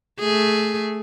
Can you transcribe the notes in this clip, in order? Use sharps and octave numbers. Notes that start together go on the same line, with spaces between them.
A3 G#4